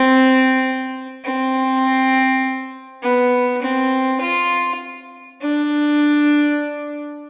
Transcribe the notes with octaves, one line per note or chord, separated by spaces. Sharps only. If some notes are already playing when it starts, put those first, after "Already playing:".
Already playing: C4
C4
B3
C4
F4
D4